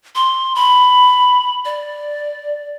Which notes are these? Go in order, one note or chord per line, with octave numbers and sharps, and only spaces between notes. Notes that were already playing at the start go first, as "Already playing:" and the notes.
C6
B5
D5